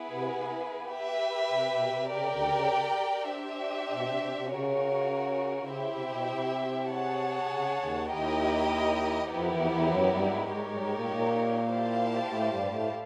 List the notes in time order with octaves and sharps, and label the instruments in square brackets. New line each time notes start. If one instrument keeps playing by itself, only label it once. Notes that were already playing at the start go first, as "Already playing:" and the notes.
Already playing: [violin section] B3 E4 G#4 B4
[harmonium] C3
[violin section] G4 B4 E5
[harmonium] C3
B2
C3
[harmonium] C#3 [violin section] G4 A#4 D5 G5
[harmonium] D2 D3
C#3
[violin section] D4 G4 C5 E5
[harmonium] B2
C3
C3
C3
[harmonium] C#3 [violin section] C#4 F#4 A#4 C#5
[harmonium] C#3 [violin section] E4 G4 C5 E5 G5
[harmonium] C3
B2
C3
[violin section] G#4 C#5 F#5 A5
[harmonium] C#3
D#2 D#3
[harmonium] D#2 D#3 [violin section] E4 G4 A#4 D#5 G5
[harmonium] F2 F3 [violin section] B3 E4 G4 A#4
[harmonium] E2 E3
F3
E2 E3
F3
F#2 F#3
G2 G3
G#2 G#3
[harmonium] G#2 G#3 [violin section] D#4 G4 A#4 C#5
[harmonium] G#2 G#3
G3
G#2 G#3
A#2 A#3
A#2 A#3
[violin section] E4 G4 C5 F5 A5
[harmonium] A2 A3
G2 G3
A2 A3